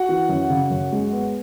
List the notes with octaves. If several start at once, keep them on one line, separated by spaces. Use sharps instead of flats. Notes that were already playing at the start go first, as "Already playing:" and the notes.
Already playing: F#4 F#5
E3
F#2
C#3
F#2
G#3
B3